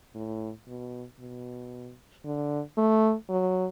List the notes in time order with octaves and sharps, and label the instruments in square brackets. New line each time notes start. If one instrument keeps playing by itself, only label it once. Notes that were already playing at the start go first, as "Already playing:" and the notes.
[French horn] A2
B2
B2
D3
A3
F#3